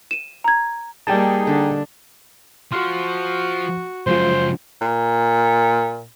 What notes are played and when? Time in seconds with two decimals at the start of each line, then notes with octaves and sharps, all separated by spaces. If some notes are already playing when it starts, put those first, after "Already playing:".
0.11 D#7 E7
0.44 A#5 G#6
1.07 G3 A#3 D#4 G#4 G5 A5
1.47 D3 D4
2.72 F3 F#4 C6 F6
4.07 F#2 C#3 F3 G#3 F4 C5
4.81 A#2